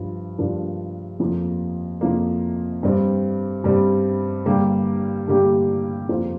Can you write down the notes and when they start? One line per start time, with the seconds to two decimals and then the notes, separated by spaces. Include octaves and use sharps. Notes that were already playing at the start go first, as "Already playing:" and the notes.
Already playing: G2 F3
0.38 G2 F3 D4 A#4
1.20 F2 F3 A#3
2.01 F2 F3 A#3
2.83 G2 G3 C4
3.64 G2 G3 C4
4.46 G2 D3 G3 A#3 G4
5.28 G2 D3 G3 A#3 G4
6.09 F2 F3 A#3 F4 C5